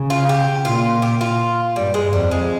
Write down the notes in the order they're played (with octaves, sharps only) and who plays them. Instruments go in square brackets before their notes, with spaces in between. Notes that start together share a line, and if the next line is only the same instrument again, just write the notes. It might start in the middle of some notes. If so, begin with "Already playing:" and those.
Already playing: [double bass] C#3
[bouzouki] F4
G4
[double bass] A#2 [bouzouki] F4
[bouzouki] G4
F4
[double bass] G2 [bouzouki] G3
[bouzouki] G#3
[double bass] F2 [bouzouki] G3
[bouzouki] G#3